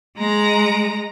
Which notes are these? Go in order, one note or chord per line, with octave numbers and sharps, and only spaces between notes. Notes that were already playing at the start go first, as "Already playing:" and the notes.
G#3 A#5